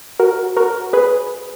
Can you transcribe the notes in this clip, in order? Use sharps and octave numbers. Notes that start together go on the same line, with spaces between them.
F#4 A#4
F#4 A#4
G#4 B4